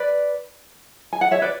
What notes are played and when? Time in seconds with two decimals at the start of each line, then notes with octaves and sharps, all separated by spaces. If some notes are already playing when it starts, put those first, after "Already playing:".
Already playing: B4 D5
1.13 G#5
1.21 F#5
1.31 C#5 E5
1.42 B4 D5